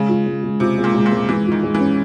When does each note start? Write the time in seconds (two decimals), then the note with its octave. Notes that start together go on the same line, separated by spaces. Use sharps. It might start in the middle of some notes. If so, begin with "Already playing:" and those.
Already playing: C#3 G#3
0.09 F4
0.26 G#3
0.43 G#3
0.60 C3 F4
0.78 G#3
0.84 A#2
0.95 G#3
1.06 A#2
1.12 G#3
1.29 E3 G#3
1.46 F4
1.52 D#3
1.63 G#3
1.75 E3
1.80 C#4